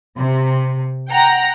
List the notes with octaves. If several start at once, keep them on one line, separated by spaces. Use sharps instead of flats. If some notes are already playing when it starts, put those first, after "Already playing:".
C3
F#5 G5 A#5